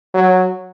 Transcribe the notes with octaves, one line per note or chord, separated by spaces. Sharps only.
F#3